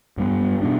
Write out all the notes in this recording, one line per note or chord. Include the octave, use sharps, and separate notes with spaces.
G2 G3 B3
B2 B3 D4